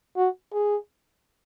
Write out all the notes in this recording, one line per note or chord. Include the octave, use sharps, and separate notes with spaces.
F#4
G#4